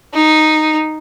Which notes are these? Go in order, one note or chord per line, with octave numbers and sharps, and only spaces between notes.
D#4